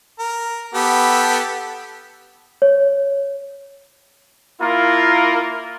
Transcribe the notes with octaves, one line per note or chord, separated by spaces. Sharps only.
A#4
B3 G4 A4
C#5
A#3 E4 F4 A#4